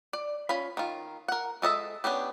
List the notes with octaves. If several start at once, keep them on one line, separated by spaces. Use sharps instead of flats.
D5
C#4 F4 B5
D#3 F4
A#4 F#5
G#3 A4 D#5 E5
B3 C#4 D4 G4